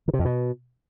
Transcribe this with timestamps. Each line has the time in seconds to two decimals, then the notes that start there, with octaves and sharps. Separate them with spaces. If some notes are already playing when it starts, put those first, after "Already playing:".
0.08 D#3
0.13 C3
0.19 F2
0.25 B2